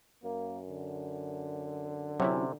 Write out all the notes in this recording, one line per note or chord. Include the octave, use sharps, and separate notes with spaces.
F#2 A#3
D3
C3 F#3 C#4 E4